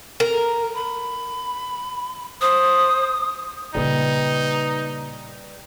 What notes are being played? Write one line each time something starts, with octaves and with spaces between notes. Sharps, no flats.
A#4
B5
C5 D#6
A#2 C#3 G3 D#4 B4